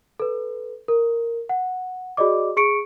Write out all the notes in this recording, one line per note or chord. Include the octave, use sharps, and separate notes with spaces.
A4 B4
A#4
F#5
F#4 G#4 D5 D#5 D6
G#4 C#6 C#7 D7